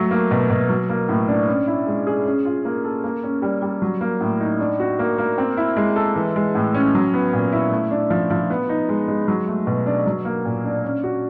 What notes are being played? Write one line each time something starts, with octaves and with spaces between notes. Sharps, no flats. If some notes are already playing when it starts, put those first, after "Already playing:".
Already playing: F#3 A3
A#3
B2
B2
F#3
A#3
A2
D4
C#4
E4
G#3
G#4
C#4
F4
A#3
A4
A#3
C#4
G3
G3
F#3
A#3
A2
D#4
D4
F#4
A#3
A#3
C4
E4
G#3
A4
E3
G#3
A2
C#4
F#3
B3
A#2
E4
A3
D4
F3
F3
B3
D#4
G#3
G#3
F#3
A3
B2
D4
F#3
A#3
A#2
D4
C#4
F#4